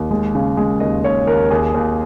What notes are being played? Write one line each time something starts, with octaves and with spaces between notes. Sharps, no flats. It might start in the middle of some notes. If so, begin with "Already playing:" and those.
Already playing: D#2
G#3
C#3
G#3
D#2 D#5
D#2 C#5
D#2 A#4
D#2 G#4
D#2